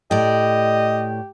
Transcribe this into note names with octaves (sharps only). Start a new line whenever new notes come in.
A2 G4 D5 D#5